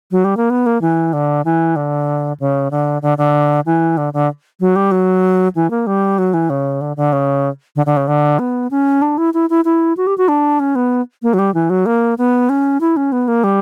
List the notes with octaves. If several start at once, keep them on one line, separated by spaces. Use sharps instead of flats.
F#3
G3
A#3
B3
A#3
E3
D3
E3
D3
C#3
D3
D3
D3
E3
D3
D3
F#3
G3
F#3
E3
A#3
G3
F#3
E3
C#3
D3
D3
C#3
D3
D3
C#3
D3
B3
C#4
D4
E4
E4
E4
E4
F#4
G4
F#4
D4
C#4
B3
A#3
F#3
G3
E3
F#3
A#3
B3
C#4
E4
C#4
B3
A#3
G3